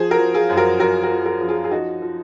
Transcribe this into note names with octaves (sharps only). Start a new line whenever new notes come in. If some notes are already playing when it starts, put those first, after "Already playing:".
Already playing: F3 G#4 C5
F#4 A#4
F3
F4 G#4
F#2
F#4 A#4
F#2 F#4 A#4
F#4 A#4
F3
F#4 A#4
F3
F4 G#4
G#4
F3 D#4 F#4
F3